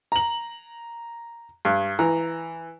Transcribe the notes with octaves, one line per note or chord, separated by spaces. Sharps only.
A#5 F#7
G2
E3 A#5